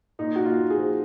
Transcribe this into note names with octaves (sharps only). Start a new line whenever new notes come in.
A#2 D#4
A#2 F#4
F4
A#2
G#4
F3